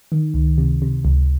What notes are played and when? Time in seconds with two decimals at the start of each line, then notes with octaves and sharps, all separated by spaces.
0.12 D#3
0.34 C#2
0.58 C3
0.82 C3
1.05 C#2